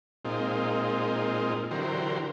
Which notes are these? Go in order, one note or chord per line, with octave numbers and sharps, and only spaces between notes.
A#2 G#3 C4 D#4 F4
D3 E3 F#3 G4 A#4 C5